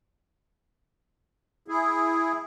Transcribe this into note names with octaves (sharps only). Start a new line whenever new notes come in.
E4 G#4